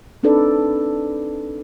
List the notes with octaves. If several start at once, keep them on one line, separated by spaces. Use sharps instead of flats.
C4 D4 D#4 A4 B4 D5